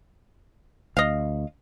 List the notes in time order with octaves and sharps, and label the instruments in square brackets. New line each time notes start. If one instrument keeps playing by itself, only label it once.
[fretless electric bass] D2 [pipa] D#5 F5